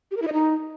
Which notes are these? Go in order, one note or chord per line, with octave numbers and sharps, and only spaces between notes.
G4
A#4
E4
D#5
D#4